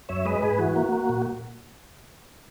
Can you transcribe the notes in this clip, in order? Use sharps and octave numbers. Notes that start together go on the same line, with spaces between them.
F#2 C#5 E5
G#3 B4 D#5
G#2 G#4 B4
E3 F#4
A#3
A#3
A#2